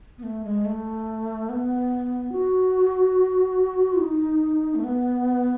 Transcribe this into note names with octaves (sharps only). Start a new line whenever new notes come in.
B3
A3
G#3
A3
B3
F#4
D#4
A3
B3